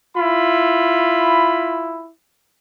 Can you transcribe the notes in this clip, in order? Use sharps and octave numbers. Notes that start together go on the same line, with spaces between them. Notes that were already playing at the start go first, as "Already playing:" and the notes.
E4 F4 B5